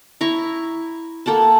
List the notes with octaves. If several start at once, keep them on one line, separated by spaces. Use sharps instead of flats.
E4 A#5 C#6
A#3 A4 F#5 A5